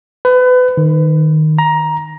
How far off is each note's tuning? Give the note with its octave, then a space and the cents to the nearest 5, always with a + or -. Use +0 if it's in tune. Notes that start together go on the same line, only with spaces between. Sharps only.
B4 +30
D#3 -5
A#5 +15